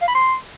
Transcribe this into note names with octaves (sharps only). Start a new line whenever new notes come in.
F5
B5
C6